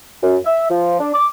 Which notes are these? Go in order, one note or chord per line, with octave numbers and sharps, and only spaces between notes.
F#2
E5
F3
D4
D6